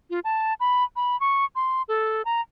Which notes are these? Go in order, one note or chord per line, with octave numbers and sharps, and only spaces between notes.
F4
A5
B5
B5
C#6
C6
A4
A#5